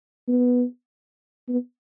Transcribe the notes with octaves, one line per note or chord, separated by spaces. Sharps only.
B3
B3